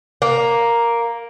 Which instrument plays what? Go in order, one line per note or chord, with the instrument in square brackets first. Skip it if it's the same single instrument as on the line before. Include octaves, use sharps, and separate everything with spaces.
[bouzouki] A#3